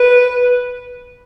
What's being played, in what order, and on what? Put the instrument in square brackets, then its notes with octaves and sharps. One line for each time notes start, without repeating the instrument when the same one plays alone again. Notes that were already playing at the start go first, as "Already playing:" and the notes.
Already playing: [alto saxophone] B4